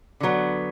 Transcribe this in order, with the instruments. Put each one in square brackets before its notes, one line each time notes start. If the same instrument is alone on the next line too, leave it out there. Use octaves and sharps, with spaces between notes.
[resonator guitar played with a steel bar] D3 F#3 B3